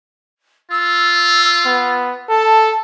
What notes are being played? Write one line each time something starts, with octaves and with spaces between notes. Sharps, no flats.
F4 E6
B3
A4 A5